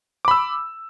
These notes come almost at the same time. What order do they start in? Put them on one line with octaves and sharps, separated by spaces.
D6 B5 E6